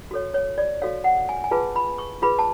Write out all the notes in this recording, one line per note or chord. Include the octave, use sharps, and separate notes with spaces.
F#4 A4 C#5
C#5
D5
F#4 A4 C#5 F5
F#5
G#5
G#5
F4 G#4 B4 A5
B5
C#6
F4 G#4 B4 B5
A5